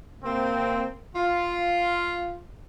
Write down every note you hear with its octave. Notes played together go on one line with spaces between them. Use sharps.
C3 A#3 C4
F4